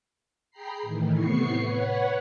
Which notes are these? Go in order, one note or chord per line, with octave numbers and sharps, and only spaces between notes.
G#4 G5 A#5 B5 C7
A2 D#3 E3
A2 C3 B3 C#6 C7 C#7
B4 C#5 F#5